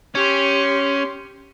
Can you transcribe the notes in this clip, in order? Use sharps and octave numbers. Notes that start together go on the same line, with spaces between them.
C#4 G4 C6